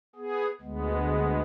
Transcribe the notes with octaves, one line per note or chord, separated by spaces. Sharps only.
B3 G#4
D2 G#3 B3